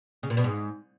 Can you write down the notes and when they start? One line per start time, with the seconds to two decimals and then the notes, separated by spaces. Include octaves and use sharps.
0.23 C#3
0.30 A#2
0.37 B2
0.44 G#2